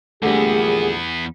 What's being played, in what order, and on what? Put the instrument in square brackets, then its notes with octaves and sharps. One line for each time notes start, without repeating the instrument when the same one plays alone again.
[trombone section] A#1 G#4 [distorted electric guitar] E2 B3 [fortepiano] D3 G3 [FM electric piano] A3